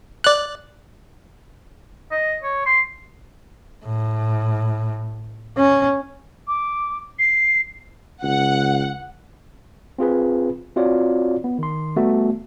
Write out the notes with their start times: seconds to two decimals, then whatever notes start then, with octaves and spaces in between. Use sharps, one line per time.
0.24 D5 F#6
2.11 D#5
2.43 C#5
2.66 C6
3.85 A2
5.57 C#4
6.47 D6
7.19 C7
8.23 C#2 F#5
9.98 C4 F4 G#4 B4
10.76 C4 F4 F#4 C#5 D5
11.44 B3
11.58 D#3 C6
11.96 G3 A3 B3 F#4